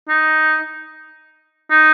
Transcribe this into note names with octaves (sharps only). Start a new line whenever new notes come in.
D#4
D#4